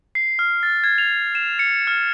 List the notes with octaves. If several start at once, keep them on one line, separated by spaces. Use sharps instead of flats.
C7
F6
A6
G#6
F7
E7
C#7
F6